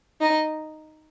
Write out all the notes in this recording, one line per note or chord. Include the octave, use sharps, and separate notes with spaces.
D#4 D#5